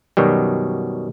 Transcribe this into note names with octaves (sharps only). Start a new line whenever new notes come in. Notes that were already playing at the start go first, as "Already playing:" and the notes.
F#2 B2 D#3 F#3 G3